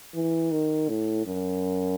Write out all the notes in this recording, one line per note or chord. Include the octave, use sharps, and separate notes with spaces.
E3
D#3
A2
F#2